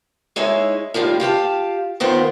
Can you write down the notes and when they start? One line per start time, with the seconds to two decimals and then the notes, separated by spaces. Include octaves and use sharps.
0.36 G#3 D#4 E4 C#5 E5
0.94 A2 D#3 G3 F4
1.20 F4 G4 F5 A5
2.00 D#2 D#3 B3 F4 C5